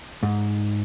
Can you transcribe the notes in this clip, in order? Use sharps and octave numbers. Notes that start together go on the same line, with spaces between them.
G#2